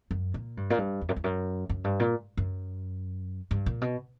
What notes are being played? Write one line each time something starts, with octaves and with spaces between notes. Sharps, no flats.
F#2
A#2
G2
A#2
G2
E2
F#2
E2
F#2
F#2
G2
A#2
F#2
G2
A#2
B2